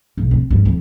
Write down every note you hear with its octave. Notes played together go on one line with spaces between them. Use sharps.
B1
C4
G2
F2